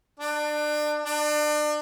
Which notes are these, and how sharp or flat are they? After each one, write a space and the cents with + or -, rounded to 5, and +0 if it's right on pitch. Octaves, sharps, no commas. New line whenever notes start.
D4 +30
D4 +35